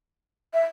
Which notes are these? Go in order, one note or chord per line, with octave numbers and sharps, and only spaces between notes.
E5